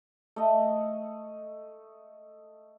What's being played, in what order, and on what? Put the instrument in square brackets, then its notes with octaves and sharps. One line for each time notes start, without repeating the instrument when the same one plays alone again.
[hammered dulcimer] A3 D#5